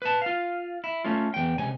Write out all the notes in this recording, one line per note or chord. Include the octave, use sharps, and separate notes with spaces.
B4 A5
F4 F5
E4
A3 C#4 F4
E2 G5
C#2 C3 G#5